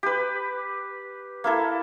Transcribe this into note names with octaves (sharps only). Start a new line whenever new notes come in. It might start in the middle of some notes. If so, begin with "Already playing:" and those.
G4 B4
A#3 E4 A4